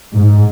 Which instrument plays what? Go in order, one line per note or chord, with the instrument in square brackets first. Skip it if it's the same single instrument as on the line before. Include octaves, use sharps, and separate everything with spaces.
[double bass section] G#2